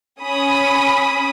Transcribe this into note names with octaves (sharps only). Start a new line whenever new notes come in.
C#4 B5 D#6